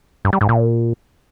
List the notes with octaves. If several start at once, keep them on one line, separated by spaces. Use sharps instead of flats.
G2
G3
G#2
A#2